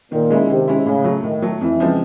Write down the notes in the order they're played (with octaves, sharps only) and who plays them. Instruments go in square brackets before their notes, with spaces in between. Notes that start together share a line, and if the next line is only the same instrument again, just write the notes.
[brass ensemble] A#2 [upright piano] D#3
[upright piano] G#3 C#4 E4
[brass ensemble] C3 [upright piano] D#3
[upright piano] G#3 C#4 E4
[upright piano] A2 [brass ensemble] C#3
[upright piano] F#3
A3
[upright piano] A2 [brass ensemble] D#3
[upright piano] F#3 A3
[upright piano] F2 [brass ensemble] E3
[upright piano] C#3 F3 G#3 C4